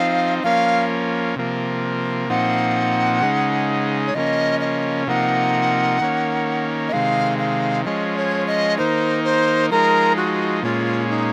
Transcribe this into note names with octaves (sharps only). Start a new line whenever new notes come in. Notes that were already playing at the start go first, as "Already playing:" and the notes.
Already playing: F3 C4 D#4 F5
F3 A#3 C#4 F5
C3 F3 A#3
A#2 F3 C4 D#4 F#5
C#3 G#3 D#4
C#5
C#3 F3 A#3 C#4 D#5
D#5
C3 F3 A#3 D#4 F#5
D#3 A#3 C#4
D#5
C3 D#3 G#3 F5
F5
F3 G#3 C#4 D#5
C#5
D#5
D#3 A#3 D#4 C5
C5
F3 G#3 D#4 A#4
F#4
A#2 G#3 C#4 F4
D#4